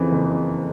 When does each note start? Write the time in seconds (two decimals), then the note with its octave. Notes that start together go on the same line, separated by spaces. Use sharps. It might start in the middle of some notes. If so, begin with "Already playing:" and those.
Already playing: F2 C#3 E3
0.12 F#1
0.30 C#3